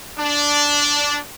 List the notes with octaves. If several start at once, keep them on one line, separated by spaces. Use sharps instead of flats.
D4